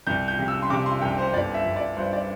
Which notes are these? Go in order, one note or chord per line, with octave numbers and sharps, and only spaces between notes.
C2 G6
G6
C3
E6
C6
C3 D6
C6
C2 G5
C5
G1 D5
E5
G1
D5
G2 C5
D5